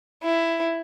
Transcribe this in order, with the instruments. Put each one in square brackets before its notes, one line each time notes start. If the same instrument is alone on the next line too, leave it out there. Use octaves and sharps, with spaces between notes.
[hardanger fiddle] E4